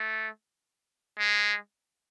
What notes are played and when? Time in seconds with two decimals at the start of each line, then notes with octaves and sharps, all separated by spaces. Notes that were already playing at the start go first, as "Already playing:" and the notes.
Already playing: A3
1.18 G#3